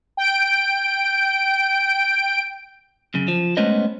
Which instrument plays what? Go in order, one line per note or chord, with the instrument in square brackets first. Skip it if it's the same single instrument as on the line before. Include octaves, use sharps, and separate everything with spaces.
[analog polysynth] G5 D7
[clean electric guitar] F#2 C#3
F3
G#3 A3 B3 C#4 C5 D#5